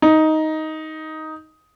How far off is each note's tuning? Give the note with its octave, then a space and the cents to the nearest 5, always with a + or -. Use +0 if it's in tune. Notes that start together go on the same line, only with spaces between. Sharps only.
D#4 +10